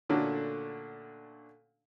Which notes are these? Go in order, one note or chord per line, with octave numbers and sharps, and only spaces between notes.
A#2 D3 A3 C#4 D4 F#4